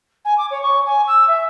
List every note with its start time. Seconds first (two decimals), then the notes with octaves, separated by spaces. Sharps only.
0.25 G#5
0.38 D6
0.50 C#5
0.62 C#6
0.86 G#5
1.07 E6
1.27 E5